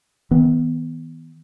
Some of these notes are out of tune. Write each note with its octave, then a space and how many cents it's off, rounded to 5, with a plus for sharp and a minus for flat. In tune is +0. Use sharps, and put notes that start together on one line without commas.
E3 -45 B3 +0